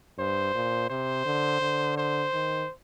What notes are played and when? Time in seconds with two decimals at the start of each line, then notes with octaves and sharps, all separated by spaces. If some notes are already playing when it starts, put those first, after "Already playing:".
0.18 G2 C5
0.54 A#2
0.90 C3 C5
1.25 D3
1.61 D3
1.97 C5
2.33 D#3